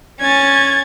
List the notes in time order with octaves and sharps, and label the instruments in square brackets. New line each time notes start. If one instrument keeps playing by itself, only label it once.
[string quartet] C#4 [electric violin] G#6 A6